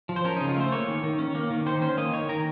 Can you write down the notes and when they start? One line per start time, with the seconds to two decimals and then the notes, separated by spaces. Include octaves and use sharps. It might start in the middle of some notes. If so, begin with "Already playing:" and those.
0.09 F3
0.16 C5
0.25 C#4 A#4
0.36 C#3 D#4
0.49 F4
0.56 A3 C5
0.72 A#3 C#5
0.88 D#3
1.03 D#3
1.19 C#4
1.35 A#3
1.50 D#3
1.66 D#3 C5
1.82 C#4 C5
1.97 A#3 D#5
2.13 D#3 C#5
2.29 D#3 A#4